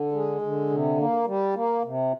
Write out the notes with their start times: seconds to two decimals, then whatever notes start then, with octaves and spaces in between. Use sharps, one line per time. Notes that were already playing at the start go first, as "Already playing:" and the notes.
Already playing: D3
0.12 G#3
0.42 D3
0.70 C3
0.98 A#3
1.26 G3
1.55 A#3
1.84 C3